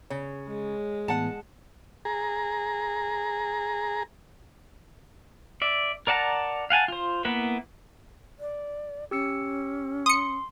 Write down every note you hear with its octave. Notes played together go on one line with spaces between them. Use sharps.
C#3 C#5
G#3
A2 E3 B3 F#5 A5
G#4 A#5
D5 E5
A#4 D5 F#5 A5 A#5
F5 F#5 G#5 A5
F4 C5
A#3 B3 E4 B4
D5
C#4 G4 E6 C#7
C6 D#6 C#7